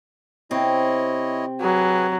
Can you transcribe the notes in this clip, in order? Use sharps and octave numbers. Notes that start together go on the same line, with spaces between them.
C3 C4 E4 C#5 D#5
F#3 G#4 B4 G#5